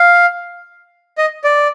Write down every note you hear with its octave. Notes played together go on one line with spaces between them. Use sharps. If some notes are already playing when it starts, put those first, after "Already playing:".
Already playing: F5
D#5
D5